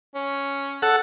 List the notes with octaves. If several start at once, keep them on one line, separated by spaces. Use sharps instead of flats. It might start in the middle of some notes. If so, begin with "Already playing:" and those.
C#4
A4 F#5